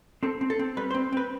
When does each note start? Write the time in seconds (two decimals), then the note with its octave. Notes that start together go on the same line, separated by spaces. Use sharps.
0.23 C4 A4
0.41 C4
0.50 A4
0.59 C4
0.77 G3 B4
0.91 C5
0.94 C4
1.13 C4 B4